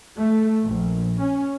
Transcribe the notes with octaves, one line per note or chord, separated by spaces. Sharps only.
A3
A#1
C#4